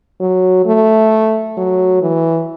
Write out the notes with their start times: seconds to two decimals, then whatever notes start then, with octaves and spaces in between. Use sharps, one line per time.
0.20 F#3
0.66 A3
1.57 F#3
2.02 E3